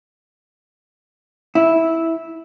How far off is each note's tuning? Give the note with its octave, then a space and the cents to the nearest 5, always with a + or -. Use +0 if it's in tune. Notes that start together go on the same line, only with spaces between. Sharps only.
E4 -10